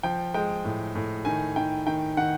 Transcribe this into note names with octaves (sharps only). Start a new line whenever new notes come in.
F3 G5
G#3 G5
A2
A2
D#3 G#5
D#3 G5
D#3 G5
D#3 F#5